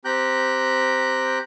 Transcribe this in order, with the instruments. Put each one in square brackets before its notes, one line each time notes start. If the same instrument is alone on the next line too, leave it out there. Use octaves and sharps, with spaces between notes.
[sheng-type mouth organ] C4 G4 G5 A#5 F#6 G6